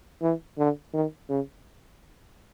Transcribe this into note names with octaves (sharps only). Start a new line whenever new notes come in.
E3
D3
D#3
C#3